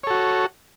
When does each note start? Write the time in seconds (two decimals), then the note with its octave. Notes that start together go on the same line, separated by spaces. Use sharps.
0.03 C#5
0.07 A4
0.10 F#4